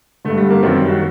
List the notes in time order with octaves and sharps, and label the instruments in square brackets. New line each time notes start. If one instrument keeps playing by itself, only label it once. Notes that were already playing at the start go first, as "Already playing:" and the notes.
[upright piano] G2 D3 A3
G3
A#3
F#2 D#3 C4
G3
F#4